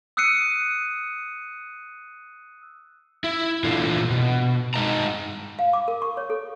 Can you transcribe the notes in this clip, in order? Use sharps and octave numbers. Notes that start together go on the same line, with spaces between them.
D#6 E6 F#6 C7 C#7 D#7
E4
A#2 E3 D4 F4 A4
B2
G2 G#3 D#4 D#5 A5 A#5
F5
D6
A#4
C#6
C#5
A4